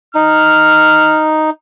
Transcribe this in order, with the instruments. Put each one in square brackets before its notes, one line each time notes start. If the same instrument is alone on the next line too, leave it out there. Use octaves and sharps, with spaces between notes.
[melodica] D#4 [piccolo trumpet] F6